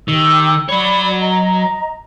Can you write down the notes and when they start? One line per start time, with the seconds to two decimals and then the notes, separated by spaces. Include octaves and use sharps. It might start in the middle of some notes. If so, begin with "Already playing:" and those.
0.08 D#3 G4 E6
0.69 F#3 C#5 D5 B5
1.19 D#5 A#5